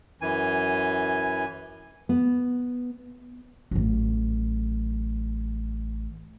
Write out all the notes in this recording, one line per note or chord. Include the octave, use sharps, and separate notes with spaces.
F#2 E3 G#5
B3
A1 F#3